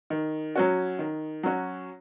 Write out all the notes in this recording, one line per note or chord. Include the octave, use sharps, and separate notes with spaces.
D#3
F#3 C#4 F#4
D#3
F#3 C#4 F#4